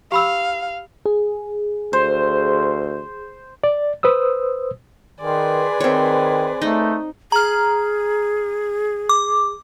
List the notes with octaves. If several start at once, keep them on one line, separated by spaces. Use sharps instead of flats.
G4 F5 B5 E6
G#4
D2 C5
D5
B4 C5 D#6 E6
D#3 G#4 B4 D5 G#5 C6
D#3 C4 C#5
A3 D#4
G#4 A#5 F6
D6